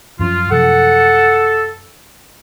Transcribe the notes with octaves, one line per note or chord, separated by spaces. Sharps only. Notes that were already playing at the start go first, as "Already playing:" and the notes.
F#2 F3 C#4 F4
F#2 C3 F3 A4 F#5